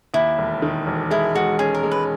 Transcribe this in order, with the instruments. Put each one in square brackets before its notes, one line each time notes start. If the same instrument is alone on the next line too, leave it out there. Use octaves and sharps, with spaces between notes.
[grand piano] D#2 [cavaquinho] E4
[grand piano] E1
D#3
E1
[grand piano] G#3 [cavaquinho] E4
[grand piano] G#3 [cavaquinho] F#4
[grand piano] C#4 [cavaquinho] G#4
[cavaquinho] A#4
[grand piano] G#3
[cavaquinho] B4